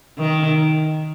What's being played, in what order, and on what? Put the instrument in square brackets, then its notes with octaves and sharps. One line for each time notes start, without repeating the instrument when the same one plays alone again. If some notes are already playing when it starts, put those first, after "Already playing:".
[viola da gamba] D#3